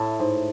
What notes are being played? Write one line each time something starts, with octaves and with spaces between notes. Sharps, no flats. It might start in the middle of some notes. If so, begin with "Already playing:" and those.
Already playing: A2 E4 A5
G#2